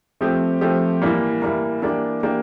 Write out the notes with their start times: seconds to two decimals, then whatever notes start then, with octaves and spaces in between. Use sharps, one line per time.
0.21 F3 A3 C4 G4
0.61 F3 A3 C4 G4
1.02 A2 E3 G3 A#3
1.42 A2 E3 G3 A#3
1.82 E3 A#3 D4 G4 D5
2.23 E3 A#3 D4 G4 D5